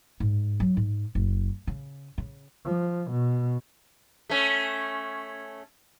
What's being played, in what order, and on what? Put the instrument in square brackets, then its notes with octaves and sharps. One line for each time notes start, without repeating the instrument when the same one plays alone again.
[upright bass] G#2
F#3
G#2
F#1
C#3
C#3
[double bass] F3
B2
[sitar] A3 C#4